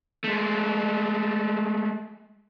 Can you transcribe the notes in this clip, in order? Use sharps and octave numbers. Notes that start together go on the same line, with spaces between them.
G#3 A3